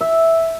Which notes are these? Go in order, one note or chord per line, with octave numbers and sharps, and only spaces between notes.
E5